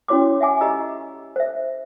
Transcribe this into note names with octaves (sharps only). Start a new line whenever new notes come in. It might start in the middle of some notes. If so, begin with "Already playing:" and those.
C#4 E4 F#4 C#5 C6 D6
E5 F#5 G#5 D6
G4 D#5 A#5 E6
C5 E5